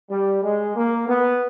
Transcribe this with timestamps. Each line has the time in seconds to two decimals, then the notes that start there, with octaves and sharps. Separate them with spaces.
0.10 G3
0.42 G#3
0.76 A#3
1.09 B3